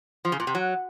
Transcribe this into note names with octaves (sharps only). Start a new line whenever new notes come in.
F3
C#3
A#2
C3
F#3